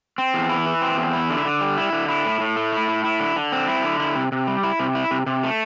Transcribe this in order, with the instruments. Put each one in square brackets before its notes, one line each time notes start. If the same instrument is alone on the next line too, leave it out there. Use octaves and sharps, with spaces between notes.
[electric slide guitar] C4
E2
E4
E3
C4
E2
E4
D3
D3
G3
E4
D3
E4
A2
A2
A3
E4
A2
E4
D3
D3
C4
E4
D3
E4
C3
C3
G3
E4
C3
E4
C3
C3
A3